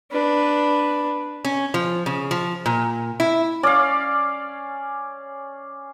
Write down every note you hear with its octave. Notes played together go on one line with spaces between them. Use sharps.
D4 B4
C#4
F3
C#3
F3
A#2
E4
C#4 D5 F5